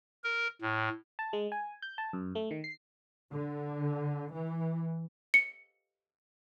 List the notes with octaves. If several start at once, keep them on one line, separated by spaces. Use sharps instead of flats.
A#4
A2
A5
G#3
G#5
G6
A5
F#2
A3
D#3
C7
D3
E3
C#7